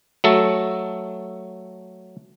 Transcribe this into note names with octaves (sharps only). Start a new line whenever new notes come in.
F#3 A3 A4